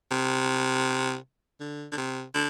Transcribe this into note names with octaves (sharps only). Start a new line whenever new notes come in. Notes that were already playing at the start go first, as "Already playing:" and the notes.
C3
D3
D3
C3
D3